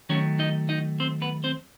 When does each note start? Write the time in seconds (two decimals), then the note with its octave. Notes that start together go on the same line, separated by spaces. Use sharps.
0.09 D#3 F#3 A3 C#4 C#5
0.39 D#4 D#5
0.69 D#4 D#5
1.00 C4 C5
1.22 B3 B4
1.44 C4 C5